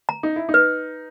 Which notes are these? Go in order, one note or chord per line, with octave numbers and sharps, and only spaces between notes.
A#5
D#4
E4
D#4
B4